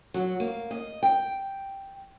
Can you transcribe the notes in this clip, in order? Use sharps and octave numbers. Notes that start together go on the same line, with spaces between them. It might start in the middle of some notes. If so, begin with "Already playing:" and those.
F#3
A#3
D#5
G5